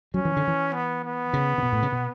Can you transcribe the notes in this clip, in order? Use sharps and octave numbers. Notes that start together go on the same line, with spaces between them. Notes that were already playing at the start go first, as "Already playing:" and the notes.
F#3 C#4
E3
D3
E3
B3
B3
C#3
C#3
B2
A2
C#3
B2